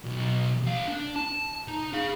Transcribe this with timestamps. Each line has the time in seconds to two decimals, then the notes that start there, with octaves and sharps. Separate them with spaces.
0.05 B1
0.63 C2 F5
0.87 D4
1.16 A5
1.68 D#4
1.93 G#4 F5